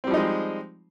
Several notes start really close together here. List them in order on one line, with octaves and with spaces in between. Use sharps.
C4 G3 F3 D#4 G#3